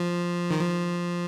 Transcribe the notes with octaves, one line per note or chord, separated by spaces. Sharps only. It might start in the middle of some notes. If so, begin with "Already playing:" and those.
Already playing: F3
D#3
F3